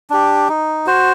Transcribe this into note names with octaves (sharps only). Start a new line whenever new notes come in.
D4 G4
D#4
F#4 C5